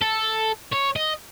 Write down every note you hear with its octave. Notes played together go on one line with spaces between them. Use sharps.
A4
C#5
D#5